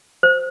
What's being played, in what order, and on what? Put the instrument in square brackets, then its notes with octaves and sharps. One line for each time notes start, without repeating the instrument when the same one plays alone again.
[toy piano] C5